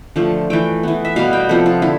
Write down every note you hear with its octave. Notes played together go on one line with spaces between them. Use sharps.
D3 F3 A3 A5
E3 A3 G5
E3 B3
E5
B2 G3 B3 F5
G5
C3 F3 B3 A4
F4
D3 E4